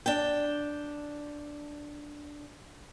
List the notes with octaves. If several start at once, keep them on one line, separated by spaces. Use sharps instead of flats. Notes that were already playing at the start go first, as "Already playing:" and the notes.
D4 G5